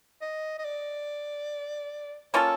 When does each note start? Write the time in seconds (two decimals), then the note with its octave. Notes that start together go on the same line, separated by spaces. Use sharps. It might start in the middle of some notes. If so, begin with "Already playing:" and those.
0.22 D#5
0.58 D#5
0.64 D5
2.34 A#3 C#4 F4 A4 C#5